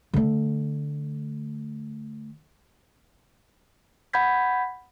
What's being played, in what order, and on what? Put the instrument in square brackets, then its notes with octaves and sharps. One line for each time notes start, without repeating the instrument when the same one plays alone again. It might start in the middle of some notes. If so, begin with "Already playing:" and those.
[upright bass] D3 A3
[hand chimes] F#5 B5 G6 G#6 B6